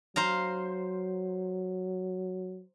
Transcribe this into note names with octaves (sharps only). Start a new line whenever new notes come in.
F#3 C5 F5 A#5